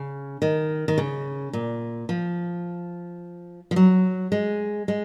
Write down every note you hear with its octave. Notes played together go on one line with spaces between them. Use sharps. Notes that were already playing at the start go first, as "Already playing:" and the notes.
Already playing: C#3
D#3
D#3
C#3
A#2
F3
F3
F#3
G#3
G#3